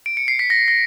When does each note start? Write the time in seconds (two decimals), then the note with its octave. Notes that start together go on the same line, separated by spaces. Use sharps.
0.06 D7
0.17 C#7
0.28 C7
0.39 B6
0.50 A#6
0.68 A#6